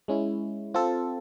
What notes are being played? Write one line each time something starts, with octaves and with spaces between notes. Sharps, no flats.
G#3 C#4 E4
C4 F4 A4